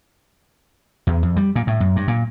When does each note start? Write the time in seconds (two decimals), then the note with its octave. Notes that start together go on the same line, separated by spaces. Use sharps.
1.07 E2
1.23 F2
1.36 G3
1.56 A#2
1.67 A2
1.80 F#2
1.96 G2
2.08 A#2